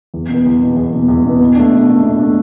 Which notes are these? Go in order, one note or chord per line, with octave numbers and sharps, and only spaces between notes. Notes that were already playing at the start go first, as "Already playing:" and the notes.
E2
B2
B3
E2
B2 B3
E2
B2 B3
E2
B2 B3
B2
A3 D4
B2
A3 D4
B2
A3 D4